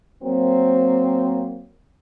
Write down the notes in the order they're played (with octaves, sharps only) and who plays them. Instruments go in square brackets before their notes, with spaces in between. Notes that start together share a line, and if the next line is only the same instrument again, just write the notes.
[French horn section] F#3 A#3 C4